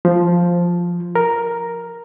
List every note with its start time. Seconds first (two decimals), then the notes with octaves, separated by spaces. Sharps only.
0.05 F3
1.15 A#4